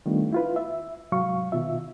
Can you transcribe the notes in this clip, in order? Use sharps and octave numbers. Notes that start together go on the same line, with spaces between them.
D#3 G3 A3 B3 D4 F4
E4 F4 B4
E5
C2 G#2 F#3 F5 C#6
B2 D#3 F4 E5